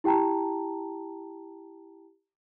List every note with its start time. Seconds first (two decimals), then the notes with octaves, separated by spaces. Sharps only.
0.04 E4 G4 G5 A5 A#5